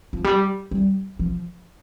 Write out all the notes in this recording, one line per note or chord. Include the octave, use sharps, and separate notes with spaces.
F3
G3
G3
F3